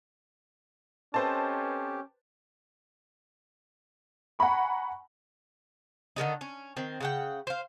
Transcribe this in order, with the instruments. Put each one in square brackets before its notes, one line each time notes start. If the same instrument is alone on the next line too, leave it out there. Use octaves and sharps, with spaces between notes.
[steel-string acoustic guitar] C4 A4 D#5 [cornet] C#4 [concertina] G4 [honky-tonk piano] B4 C5 A5
[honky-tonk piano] F#5 G#5 A#5 B5 C#6
[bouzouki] D3 D#3 G3 D#4
C#4
D#3 C4
C#3 F#5 G5
C5 F5